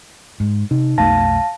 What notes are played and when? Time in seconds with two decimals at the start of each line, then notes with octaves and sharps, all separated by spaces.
0.40 G#2
0.71 C3 D#4
0.98 B1 F2 A3 F5 A5 A#6